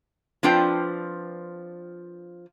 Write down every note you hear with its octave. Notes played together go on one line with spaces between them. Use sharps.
F3 C4 D4 F4 B4 G5